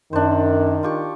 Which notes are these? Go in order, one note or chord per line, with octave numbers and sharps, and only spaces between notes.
F#2 D#3 D4 C5
F4 G4 C#6